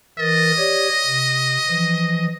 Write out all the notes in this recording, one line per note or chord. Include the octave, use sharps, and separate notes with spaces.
E3 A#4 D#5 A6
G4 C#5 D5
C3
E3 F3